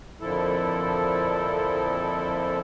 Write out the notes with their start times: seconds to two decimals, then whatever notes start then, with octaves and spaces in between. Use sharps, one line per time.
0.21 F2 A#2 D3 F3 E4 A4